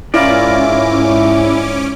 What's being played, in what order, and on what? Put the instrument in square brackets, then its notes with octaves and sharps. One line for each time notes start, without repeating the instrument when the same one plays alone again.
[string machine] G#2 [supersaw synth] C#4 D6 [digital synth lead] E4 [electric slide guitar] F4 A#4 D5